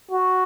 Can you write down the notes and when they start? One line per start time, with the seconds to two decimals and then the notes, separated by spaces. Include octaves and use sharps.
0.11 F#4